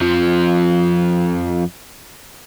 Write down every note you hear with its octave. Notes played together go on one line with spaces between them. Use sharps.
F2 F3